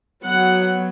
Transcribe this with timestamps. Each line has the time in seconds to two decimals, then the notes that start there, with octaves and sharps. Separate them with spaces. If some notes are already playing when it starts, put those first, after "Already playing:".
0.24 F#3 B3 F#5